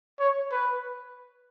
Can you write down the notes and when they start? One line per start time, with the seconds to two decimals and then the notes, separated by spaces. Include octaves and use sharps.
0.20 C#5
0.52 B4